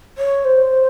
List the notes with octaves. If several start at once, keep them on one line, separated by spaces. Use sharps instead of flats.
C#5
C5